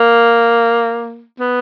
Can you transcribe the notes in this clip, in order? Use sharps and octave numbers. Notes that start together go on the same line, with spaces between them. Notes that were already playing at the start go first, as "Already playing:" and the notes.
Already playing: A#3
B3